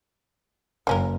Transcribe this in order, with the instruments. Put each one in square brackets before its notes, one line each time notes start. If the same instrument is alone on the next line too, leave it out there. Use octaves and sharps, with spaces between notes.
[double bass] F#1 [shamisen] A#3 C#4 A#4